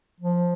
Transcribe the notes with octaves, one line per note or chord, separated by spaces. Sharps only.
F3